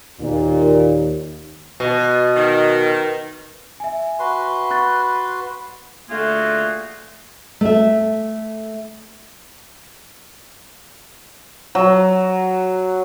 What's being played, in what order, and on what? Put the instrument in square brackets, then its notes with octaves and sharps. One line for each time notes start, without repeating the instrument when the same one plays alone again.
[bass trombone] D#2 [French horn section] A#2
[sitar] B2
[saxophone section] D#3
[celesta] E5 G#5
[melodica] F#4 B4 C6
[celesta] C#6 F#6 A6
[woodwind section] D3 A3 A#3 F4 F#4 G#4
[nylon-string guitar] A3 E5
[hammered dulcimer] F#3